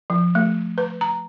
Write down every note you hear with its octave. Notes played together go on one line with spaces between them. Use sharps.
F3
A3
B4
A#5